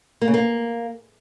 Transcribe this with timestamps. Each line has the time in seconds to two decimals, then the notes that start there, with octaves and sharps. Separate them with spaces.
0.22 A#3
0.28 C#3
0.34 A#3